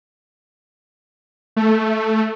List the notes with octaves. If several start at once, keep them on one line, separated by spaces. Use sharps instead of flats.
A3